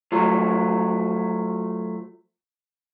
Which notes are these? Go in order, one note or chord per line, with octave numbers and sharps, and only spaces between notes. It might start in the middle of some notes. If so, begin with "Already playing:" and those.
F3 F#3 A3